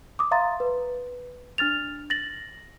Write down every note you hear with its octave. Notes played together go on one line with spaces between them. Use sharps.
D6 D#6
E5 F5 A#5 C6 A6
B4
D4 F6 A6 F7
A6 A#6 F#7